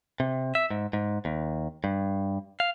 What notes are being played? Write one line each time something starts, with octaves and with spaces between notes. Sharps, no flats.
C3
E5
G#2
G#2
D#2
G2
F5